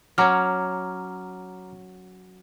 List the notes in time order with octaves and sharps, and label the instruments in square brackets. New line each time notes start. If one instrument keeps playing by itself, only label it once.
[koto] F#3 C#4 [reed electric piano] A#5 D6 F6